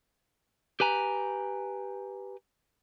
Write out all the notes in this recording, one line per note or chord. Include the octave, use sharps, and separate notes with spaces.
G4 B4 G#5 A#5